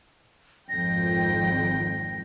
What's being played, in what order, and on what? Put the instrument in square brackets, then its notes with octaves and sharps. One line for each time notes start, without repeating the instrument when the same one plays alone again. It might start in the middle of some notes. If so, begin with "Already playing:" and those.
[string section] G#1 F2 G5 [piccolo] A#6